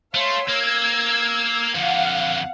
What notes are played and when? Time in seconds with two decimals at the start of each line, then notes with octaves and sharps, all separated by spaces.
0.14 A3 C#5 F5 C6
0.48 A#3 E6 G#6
1.75 F2 D3 F5 F#5